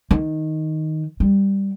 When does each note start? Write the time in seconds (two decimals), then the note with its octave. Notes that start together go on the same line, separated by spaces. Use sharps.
0.11 D#3
1.20 G3